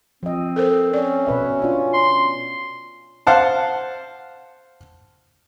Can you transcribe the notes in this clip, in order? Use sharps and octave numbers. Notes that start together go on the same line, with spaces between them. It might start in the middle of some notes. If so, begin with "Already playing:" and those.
F3 C4 D#5
A4 A#4 C5
C#4 D5
B2 B4 E5
D4 F4
C6
C5 F5 F#5 A5